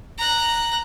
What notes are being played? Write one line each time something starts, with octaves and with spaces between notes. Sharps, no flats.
A#5 F#6